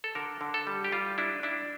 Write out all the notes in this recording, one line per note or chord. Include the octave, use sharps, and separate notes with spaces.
A4
D3 A#4
D3
A4
G3
G4
G3 F4
D4 E4
D4 E4